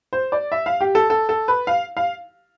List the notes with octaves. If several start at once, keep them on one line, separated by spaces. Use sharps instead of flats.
C5
D5
E5
F5
G4
A4
A4
A4
B4
F5
F5